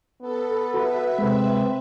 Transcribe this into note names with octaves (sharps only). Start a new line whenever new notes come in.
B3 A4
F#4 A4 B4 E5 B5
C3 G#3 C4